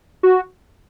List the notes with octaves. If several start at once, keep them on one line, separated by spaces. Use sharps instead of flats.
F#4